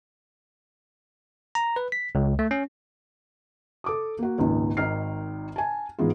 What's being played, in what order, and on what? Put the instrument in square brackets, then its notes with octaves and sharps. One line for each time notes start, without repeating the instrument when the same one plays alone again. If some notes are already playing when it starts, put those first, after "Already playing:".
[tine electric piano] A#5
B4
B6
C#2
A3
C#4
[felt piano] A4 D6 D#6
A#3 F#4
G#1 C#2 A#2 D#3
G#1 D#3 D#4 F6 C7
G#5 A5
G#2 E3 G#3 B3 F4